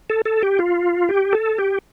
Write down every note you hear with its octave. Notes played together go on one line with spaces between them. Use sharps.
A4
A4
G4
F4
G4
A4
G4